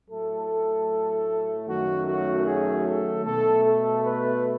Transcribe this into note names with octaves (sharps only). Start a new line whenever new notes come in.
A2 F#3 A3 A4
F#2 D#3 F#3 A3 F#4
F#4
G#4
A4
B2 A3 A4
A4
B4